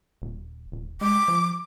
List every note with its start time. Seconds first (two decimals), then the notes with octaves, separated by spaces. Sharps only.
0.22 D#1
0.72 D#1
1.01 G#3 D6
1.28 F3